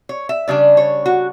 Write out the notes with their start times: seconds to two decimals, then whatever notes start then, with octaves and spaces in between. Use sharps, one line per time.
0.09 C#5
0.29 E5
0.48 C#3 G3 D4 D5
0.77 C#5
1.06 F#4